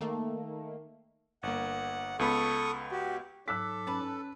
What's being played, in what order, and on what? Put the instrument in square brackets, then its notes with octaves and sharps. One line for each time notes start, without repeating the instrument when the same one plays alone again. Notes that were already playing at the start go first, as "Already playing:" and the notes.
[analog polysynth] D#3 A3 A#3
[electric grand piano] G1 A#3 [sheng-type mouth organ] F#5
[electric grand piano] C#2 B3 B5 [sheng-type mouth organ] A4 C#6 D#6
[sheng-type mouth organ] F#4 G4
[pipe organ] G#2 F#3 D6 [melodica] A4 [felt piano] E6 F#6 B6
[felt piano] C#4 [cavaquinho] B4 A5